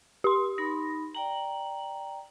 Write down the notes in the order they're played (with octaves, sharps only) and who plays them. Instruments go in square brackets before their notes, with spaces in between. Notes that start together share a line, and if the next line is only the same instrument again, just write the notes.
[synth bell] G4 C6
[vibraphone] D#4 B5 [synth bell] A#6
[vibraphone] D5 G5 A#5 [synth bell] F#7